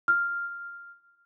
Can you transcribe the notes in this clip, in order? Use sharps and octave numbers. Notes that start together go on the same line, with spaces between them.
F6